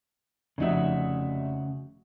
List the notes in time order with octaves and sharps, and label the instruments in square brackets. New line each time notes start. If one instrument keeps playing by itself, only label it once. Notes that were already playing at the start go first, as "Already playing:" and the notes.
[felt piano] F1 D#4 E5 [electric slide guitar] C#3 F#4